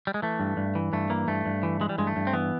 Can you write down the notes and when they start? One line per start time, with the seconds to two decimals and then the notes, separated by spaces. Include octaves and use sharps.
0.07 G3
0.14 G#3
0.22 E3 A3
0.40 G2
0.57 G2
0.75 E3
0.93 G2 A3
1.10 E3 A#3
1.28 G2 A3
1.46 G2
1.63 E3
1.80 E3 G#3
1.89 G3
1.98 G2 G#3
2.07 A3
2.16 G2
2.27 C4
2.33 E3 B3